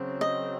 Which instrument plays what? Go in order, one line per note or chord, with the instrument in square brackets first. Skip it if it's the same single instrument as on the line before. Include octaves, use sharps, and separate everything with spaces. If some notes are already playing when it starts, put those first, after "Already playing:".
Already playing: [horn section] C#3 F#3 C4
[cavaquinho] D#5